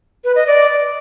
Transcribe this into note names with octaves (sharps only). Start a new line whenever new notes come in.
B4
D#5
D5